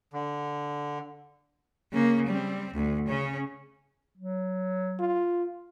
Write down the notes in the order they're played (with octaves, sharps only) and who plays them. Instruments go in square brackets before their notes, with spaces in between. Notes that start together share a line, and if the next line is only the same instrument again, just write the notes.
[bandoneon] D3
[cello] C#3 A#3
G3 C4
D2
C#3 C#4
[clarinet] F#3
[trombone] F4